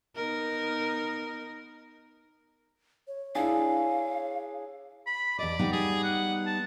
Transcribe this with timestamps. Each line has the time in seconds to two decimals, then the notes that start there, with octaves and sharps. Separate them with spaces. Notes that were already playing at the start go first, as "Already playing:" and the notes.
0.16 B3 D#4 A#4
3.08 C#5
3.35 D4 E4 G#4 F5
5.06 B5
5.38 E2 D5 D#5
5.59 G3 B3 D#4
5.73 G#4
6.04 F#5
6.46 A5